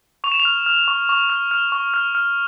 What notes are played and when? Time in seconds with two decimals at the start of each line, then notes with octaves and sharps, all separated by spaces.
0.24 C#6 F7
0.32 E7
0.40 F7
0.45 F6
0.66 F6
0.88 C#6
1.09 C#6
1.30 F6
1.51 F6
1.72 C#6
1.94 F6
2.15 F6